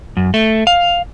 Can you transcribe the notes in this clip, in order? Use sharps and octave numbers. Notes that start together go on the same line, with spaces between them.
F#2
A3
F5